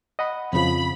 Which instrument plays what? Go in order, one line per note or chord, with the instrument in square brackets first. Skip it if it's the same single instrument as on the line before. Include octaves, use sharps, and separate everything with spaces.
[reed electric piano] D#5 F#5 B5
[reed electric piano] F2 C#3 F3 [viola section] B5